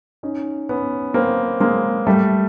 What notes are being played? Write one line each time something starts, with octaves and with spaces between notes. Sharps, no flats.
C#4 D#4
B3 C#4
A#3 C4
G#3 A#3
G3 A3